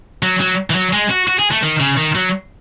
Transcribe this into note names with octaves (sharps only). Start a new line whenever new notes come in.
F#3
F#3
E3
F#3
G#3
F#4
F#4
G#4
A3
D#3
C#3
D#3
F#3